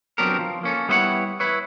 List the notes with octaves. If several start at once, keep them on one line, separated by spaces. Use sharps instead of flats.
F#3 B3 C4 D4 G4 A#4
F3
A#3 C#4 A4
G3 B3 E4 C5 C#5 F#5
E4 B4 C#5